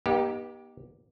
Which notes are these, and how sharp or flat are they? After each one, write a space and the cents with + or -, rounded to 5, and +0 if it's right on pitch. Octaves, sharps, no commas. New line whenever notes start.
B3 -45 D#4 +0 G4 +0